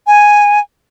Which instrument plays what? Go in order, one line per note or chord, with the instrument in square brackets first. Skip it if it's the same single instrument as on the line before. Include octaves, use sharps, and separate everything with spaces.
[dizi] G#5